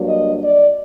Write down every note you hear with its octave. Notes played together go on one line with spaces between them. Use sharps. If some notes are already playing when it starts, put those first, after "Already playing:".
Already playing: G2 F#3 A#3 D4
D#5
D5